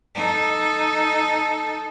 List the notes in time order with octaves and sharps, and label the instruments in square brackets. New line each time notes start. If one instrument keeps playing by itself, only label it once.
[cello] D#4 A4